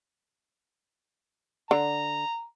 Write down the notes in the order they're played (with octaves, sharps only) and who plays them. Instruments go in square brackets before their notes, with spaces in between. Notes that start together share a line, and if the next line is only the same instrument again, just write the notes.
[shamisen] D3 [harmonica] A#5